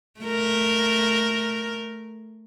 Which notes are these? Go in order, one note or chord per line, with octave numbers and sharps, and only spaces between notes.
A3 A#4